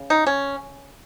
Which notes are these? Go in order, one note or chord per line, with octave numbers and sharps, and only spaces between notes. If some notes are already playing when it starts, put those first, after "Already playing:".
Already playing: C#3
D#4
C#4